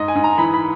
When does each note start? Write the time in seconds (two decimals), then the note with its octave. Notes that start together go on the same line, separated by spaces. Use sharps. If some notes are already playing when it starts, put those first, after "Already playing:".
Already playing: G#2 D#5
0.08 G#5
0.15 G#2
0.24 A#5
0.38 E3 B5
0.54 B5